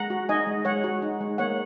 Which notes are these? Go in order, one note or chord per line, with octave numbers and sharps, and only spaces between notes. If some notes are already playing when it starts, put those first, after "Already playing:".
Already playing: G#3 F#5 A#5
F#4
D#4 D#5 G#5
G#3
G#3 C#5 F#5
F#4
D#4
G#3
A#3 C#5 F#5